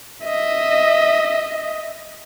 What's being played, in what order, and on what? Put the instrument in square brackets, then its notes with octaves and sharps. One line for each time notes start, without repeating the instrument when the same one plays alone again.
[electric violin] D#5 E5